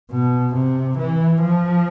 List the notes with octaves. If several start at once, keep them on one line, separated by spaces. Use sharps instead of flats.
B2
C3
E3
F3